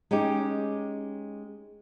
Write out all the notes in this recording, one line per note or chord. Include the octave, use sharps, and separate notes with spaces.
G#3 C#4 D#4 G4